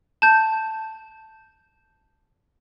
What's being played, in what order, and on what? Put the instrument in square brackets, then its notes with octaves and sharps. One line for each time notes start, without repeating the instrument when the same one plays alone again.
[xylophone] A5 G6